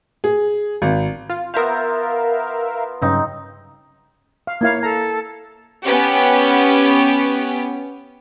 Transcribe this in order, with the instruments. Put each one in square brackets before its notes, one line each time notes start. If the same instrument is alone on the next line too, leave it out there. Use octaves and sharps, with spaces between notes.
[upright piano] G#4
G#1
[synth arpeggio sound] F4
[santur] B3 F4 C5 [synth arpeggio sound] A#4 E5 F5
[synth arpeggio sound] G2 C#3 F#3 [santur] C4 D#4
[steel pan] F5
[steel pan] A#3 E4 F5 [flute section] C#5 G#6
[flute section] A4 [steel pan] A#5
[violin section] B3 C#4 G4